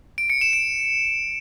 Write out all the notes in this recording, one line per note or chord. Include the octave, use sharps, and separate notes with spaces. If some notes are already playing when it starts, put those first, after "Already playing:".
D7
C#7
E7
D7